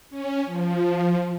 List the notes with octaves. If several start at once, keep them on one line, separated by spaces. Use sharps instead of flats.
C#4
F3